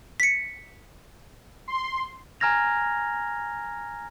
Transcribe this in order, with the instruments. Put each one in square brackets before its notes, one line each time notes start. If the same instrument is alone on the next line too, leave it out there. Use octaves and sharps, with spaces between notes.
[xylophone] B6 C#7
[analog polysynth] C6
[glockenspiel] G#5 A#5 F6 G#6 A#6 F7